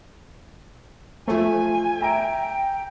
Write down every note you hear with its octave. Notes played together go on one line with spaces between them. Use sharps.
F3 A3 C5 G#5
E5 G5 A#5 D7